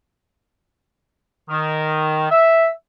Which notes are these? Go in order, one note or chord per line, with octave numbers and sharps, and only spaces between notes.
D#3
E5